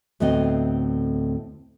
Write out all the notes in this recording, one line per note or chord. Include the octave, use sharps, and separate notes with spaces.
D2 A2 B3 C4 D#5